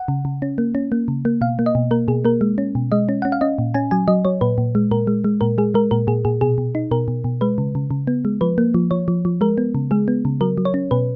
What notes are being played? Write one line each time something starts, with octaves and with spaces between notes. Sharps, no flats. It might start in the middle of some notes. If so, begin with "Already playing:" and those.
Already playing: F#5
C#3
C#3
C#4
A#3
C#4
A#3
C#3
A#3
B2 F5
A#3
D#5
B2
A#3 A#4
B2 G#4
A#3 A#4
G#3
C#4
B2
G#3 D#5
C#4
C#4 F#5
F5
C#4 D#5
A#2
C#4 G#5
F#3 G#5
F#3 D#5
F#3 C#5
A#2 B4
A#2
G#3
A#2 A#4
G#3
G#3
A#2 A#4
G#3 G#4
G#3 A#4
A#2 A#4
A#2 G#4
A#2 G#4
B2 G#4
B2
D#4
B2 A#4
B2
B2
G#3 B4
C#3
C#3
C#3
B3
G#3
F3 B4
A#3
F3
F3 C#5
F3
F3
G#3 A#4
B3
C#3
G#3 G#4
B3
C#3
F#3 A#4
F#3
C#5
C#4
B2 B4